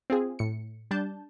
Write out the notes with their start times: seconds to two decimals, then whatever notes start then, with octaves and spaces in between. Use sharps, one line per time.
0.10 C4 F4 G#4
0.39 A2 C#7
0.91 G3 D4 A5 G6